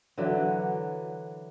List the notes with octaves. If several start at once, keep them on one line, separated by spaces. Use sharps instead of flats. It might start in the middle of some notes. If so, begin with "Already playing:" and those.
D3 E3 F#3